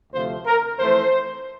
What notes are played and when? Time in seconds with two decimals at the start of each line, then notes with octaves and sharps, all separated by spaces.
0.13 D2 C3 F3 A3 C5
0.46 A#4
0.79 F2 E3 A3 C5